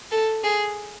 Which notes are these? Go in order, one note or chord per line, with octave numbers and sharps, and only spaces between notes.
A4
G#4